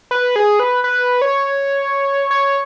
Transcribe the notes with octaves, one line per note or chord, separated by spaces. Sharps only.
B4
G#4
B4
B4
C#5
C#5